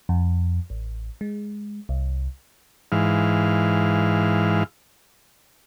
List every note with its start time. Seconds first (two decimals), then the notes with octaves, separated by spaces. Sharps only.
0.09 F2
0.70 A1
1.21 G#3
1.89 C2
2.92 G#2 E3 F5